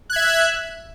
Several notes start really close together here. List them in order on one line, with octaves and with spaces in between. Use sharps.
F#6 G#6 E5